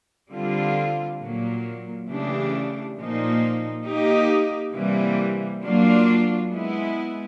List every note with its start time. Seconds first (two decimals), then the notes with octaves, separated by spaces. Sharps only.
0.31 D3 G3 C4 F4
1.19 A#2 F#3 A#3
2.08 C#3 E3 A3 D4 G4
2.96 A#2 F3 A#3 D#4
3.85 A#3 D#4 G4
4.74 C3 E3 G3 A#3
5.63 F#3 A#3 D4 F4
6.51 G#3 B3 E4